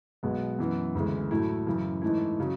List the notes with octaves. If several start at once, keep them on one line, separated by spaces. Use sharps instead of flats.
B1 B2 G#3 B3
F#2 E3 B3
D2 C#3 E3 G#3
A2 F#3 A3 E4
F#2 C#3 E3
G#2 E3 A3 E4
C#3 F#3